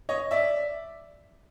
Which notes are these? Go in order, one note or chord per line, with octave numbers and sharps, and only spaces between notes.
C#5 D#5
D5 E5